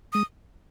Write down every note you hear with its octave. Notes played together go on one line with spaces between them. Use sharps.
G#3 D#6